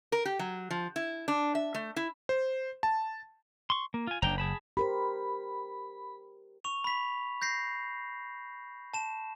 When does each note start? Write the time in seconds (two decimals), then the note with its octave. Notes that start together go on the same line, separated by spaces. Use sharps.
0.12 A#4
0.25 G4
0.39 F#3
0.70 F3
0.96 E4
1.28 D4
1.55 E5
1.74 A3
1.96 E4
2.29 C5
2.83 A5
3.70 C6 C#6
3.94 A#3
4.07 F4 G#5
4.22 F#1 D4 G5 A#5
4.38 G#4 A5 B5
4.77 G4 A#4 C5 B5
6.64 C#6 F7
6.84 B5 B6
7.42 G6 A#6 C7
8.94 A5 E7